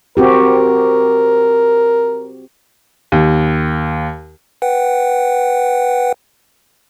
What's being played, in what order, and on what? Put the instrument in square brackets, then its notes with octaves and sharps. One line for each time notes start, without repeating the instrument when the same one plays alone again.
[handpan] C4 F#4 G4 [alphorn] A#4
[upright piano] D#2
[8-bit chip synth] B4 F#5 G5